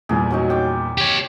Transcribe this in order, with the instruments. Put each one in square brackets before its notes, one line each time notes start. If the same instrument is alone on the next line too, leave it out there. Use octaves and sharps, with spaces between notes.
[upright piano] E2 A#2 G3 [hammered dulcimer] G#4
[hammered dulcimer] F#3 C#4 D#4
G5 D6
[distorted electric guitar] G4 C#5